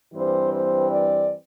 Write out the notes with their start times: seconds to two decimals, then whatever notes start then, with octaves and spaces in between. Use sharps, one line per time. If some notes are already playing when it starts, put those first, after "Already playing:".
0.13 G2 E3 G3 C4 C5
0.51 C5
0.89 D5